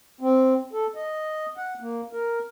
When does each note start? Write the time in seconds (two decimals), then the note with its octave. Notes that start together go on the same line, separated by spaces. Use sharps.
0.21 C4
0.73 A4
0.95 D#5
1.57 F#5
1.80 A#3
2.13 A#4